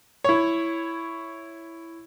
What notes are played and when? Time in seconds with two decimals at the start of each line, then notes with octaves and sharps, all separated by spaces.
0.24 E4 C#5